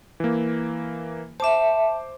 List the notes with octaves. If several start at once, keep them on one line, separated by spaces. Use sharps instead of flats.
E3 A#3
C5 E5 A5 D6